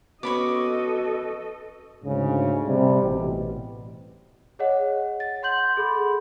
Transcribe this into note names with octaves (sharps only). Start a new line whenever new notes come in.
B3 C#4 F#4 A4 C#5 D#5 B5 D6
D2 G#2 C#3
C3 G3
A1 B2
G#4 C#5 D#5 F#5
A6
F#5 C6 G6 F#7
G#4 A4 B5 C6